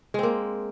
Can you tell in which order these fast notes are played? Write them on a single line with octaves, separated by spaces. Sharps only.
G#3 C4 A#3